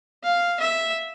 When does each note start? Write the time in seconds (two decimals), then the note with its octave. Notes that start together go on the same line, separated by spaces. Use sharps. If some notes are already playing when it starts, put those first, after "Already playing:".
0.24 F5
0.60 E5